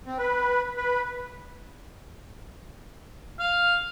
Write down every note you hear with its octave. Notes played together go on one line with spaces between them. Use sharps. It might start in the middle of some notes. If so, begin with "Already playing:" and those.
C4
B4
B4
F5